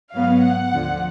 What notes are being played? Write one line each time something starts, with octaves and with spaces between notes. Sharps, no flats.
G#2 F#3 B3 F5
F#5
D2 D3 F3